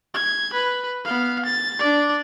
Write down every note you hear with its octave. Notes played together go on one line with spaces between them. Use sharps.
G#6
B4
B3 F5
A6
D4 D5